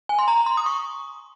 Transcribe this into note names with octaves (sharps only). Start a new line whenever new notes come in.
G#5
C6
A#5
C6
D#6
C#6